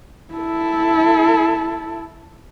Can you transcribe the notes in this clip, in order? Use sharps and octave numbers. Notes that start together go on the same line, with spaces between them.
E4 A4